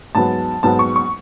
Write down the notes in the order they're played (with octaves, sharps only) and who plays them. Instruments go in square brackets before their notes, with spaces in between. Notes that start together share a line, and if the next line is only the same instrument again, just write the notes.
[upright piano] G#2 F#3 B3 A5
G#2 F#3 B3 A5
C#6
C#6